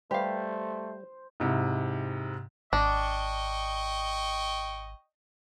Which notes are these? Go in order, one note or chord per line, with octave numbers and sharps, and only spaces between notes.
G3 A3 G4 C5 F5
G#2 C3 E4
G#1 D4 D#5 G5 C#6